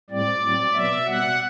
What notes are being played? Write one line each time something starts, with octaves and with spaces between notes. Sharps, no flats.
A2 G3 C4 D5
A2 F#3 C4
B2 F#3 B3 E5
B2 G3 B3 F#5